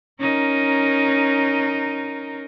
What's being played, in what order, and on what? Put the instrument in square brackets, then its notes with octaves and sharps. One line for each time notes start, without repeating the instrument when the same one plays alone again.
[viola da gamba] C#4 D#4 A#4